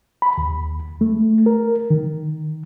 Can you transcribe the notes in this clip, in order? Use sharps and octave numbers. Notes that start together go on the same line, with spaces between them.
B5
D#2
A3
A#4
D#3